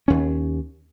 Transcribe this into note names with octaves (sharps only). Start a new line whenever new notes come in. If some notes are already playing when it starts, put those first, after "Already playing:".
D#2 C#4